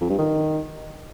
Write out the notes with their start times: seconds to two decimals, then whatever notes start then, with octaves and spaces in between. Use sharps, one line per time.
0.01 F2
0.10 G2
0.19 D#3